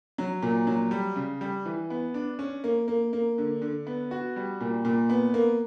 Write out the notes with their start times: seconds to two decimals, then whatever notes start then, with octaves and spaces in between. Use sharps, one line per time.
0.18 F#3
0.42 A#2
0.67 F#3
0.91 G3
1.16 C#3
1.41 G3
1.66 E3
1.90 B3
2.14 D4
2.39 C#4
2.64 A#3
2.88 A#3
3.13 A#3
3.38 D3
3.62 D3
3.87 B3
4.11 F#4
4.36 G3
4.61 A#2
4.85 A#2
5.09 B3
5.34 A#3